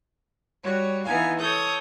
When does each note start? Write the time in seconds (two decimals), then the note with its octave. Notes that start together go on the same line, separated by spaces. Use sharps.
0.63 G3 F#4 C#5
1.05 E3 B3 D#4 F5 G#5
1.39 A4 C#5 D#6 G6